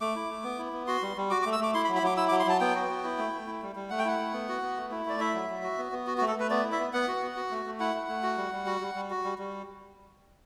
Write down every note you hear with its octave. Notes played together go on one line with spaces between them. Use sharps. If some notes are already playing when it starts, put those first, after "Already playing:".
A3 D6
E4
A3
B3
E4
B3
F#4 C6
G3
G3
F#4 D6
D6
A3
E6
A3 D6
E4 C6
B5
F#3
B5
F#3 D6
E4 E6
D6
F#3
C6
F#3 A5
B3 G5
F#4
B3
E4
A3
A3
E4
G3
G3
A3 F#5
G5
E4 F#5
A3
B3
F#4
B3
A3
E4
A3 D5
E4 E5
F#3
F#3
F#4
B3
B3
F#4
F#4
A3
A4
A3 B4
B3 D5
E4
E5
B3
B3 F#5
F#4
B3
F#4
A3
A3
E4 F#5
A3
A3
F#4
G3
G3
F#4
G3
G3
F#4
G3
G3